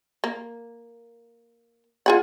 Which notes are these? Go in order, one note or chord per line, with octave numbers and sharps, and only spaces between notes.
A#3
F4 G#4 F#5